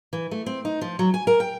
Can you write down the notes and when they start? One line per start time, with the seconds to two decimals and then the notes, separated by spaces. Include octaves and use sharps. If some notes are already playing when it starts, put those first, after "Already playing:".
0.13 E3
0.31 A3
0.46 C4
0.65 D#4
0.81 F3
0.99 F#3
1.14 G#5
1.27 A#4
1.40 G5